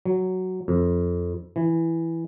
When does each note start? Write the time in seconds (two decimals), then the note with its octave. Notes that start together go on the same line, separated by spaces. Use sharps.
0.05 F#3
0.68 F2
1.56 E3